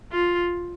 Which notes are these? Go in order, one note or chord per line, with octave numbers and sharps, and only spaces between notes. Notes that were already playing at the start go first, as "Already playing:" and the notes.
F4